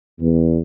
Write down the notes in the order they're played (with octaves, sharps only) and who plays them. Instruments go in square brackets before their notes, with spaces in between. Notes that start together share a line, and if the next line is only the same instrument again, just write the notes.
[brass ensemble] E2